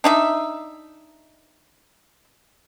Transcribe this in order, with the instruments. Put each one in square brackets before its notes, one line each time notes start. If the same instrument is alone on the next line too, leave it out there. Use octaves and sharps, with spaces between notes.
[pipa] D4 D#4 E5